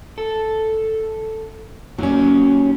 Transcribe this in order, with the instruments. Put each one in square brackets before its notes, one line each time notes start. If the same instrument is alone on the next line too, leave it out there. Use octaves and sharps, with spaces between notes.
[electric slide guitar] A4
[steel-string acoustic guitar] F#3 C#4 [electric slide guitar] A#3 D#4 G4